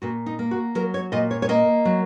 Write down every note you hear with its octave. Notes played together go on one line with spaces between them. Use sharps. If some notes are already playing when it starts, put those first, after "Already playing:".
A#2 F#4
D#4
A#3
F#4
F#3 A#4
C#5
A#2 D#5
C#5
C#5
A#3 D#5
F#3